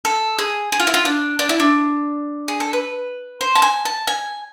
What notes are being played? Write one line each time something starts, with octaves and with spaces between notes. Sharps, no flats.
A4
G#4
G#4
F4
E4
F4
D4
D4
E4
D4
G#4
A4
B4
C5
A5
G#5
A5
G#5